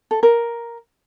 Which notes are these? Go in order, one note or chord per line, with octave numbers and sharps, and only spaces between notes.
A4
A#4